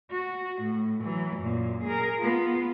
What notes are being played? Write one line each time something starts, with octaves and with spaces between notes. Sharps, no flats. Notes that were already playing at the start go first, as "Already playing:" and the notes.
F#4
A2
E3 F#3
F#2 A#2
G#4 A#4
B3 F4